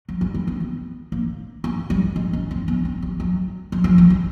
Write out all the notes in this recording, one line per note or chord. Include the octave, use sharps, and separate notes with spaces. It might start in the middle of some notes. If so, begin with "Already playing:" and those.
F#3
G3
G3
C4
B3
A#3
A#3
G3
G#3
C#4
C4
B3
C4
G3
F#3
F#3
F3
F#3
G3